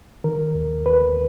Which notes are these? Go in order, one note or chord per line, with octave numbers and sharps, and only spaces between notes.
D#3 A#4
D#2
D#2 B4